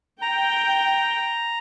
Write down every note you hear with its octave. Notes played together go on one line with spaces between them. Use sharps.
G5 A#5